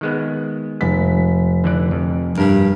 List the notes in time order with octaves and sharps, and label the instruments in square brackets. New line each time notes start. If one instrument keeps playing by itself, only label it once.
[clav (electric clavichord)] D#3 G#3 B3
[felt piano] F1 B6
[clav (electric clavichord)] D3 E3 D5
F2
[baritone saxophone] G2 [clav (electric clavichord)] A#4 F5